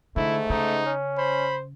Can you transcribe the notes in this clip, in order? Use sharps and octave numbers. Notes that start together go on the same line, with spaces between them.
G#2 D3 A3 E4
G#2 C#3 D#4
C#4
C5 B5